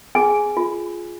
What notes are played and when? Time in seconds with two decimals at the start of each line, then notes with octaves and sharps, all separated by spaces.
0.15 G#4 G#5
0.57 F4